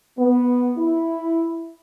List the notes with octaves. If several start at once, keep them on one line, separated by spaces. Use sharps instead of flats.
B3
E4